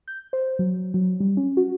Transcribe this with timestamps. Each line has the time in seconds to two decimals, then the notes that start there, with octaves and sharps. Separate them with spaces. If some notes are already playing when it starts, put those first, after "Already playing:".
0.08 G6
0.33 C5
0.59 F#3
0.94 F#3
1.20 G3
1.37 C#4
1.57 F#4